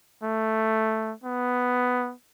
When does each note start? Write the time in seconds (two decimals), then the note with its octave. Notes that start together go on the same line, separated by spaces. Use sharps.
0.23 A3
1.23 B3